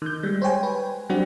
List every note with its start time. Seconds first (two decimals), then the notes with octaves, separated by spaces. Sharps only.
0.02 D#3 G6
0.23 G3 G#3
0.42 C5 C#5 G5 G#5
0.63 B4
1.09 F#3 G3 C4 D4 F#4 G4